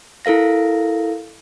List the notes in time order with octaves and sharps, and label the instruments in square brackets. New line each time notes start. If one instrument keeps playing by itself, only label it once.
[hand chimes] E4 A4 A#4 F5 A#6